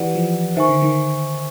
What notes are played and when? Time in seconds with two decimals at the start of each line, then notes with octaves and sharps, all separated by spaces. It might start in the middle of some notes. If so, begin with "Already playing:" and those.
Already playing: E3 G4 B4 D5 F#5
0.15 F3
0.56 D#3 C5 E5 G#5 C#6
0.69 D3
0.82 D#3